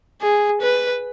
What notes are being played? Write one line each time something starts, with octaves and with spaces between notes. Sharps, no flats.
G#4
B4